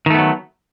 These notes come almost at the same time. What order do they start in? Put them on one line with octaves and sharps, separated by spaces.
D#3 A3 B3 F#3